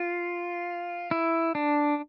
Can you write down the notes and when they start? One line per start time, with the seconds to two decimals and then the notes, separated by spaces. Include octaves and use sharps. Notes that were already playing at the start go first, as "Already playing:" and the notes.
Already playing: F4
1.11 E4
1.55 D4